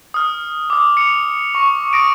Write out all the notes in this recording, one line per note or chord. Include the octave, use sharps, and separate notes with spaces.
D#6 F6
D6 D#6
C#7 F7
C#6
D#6 A#6 D7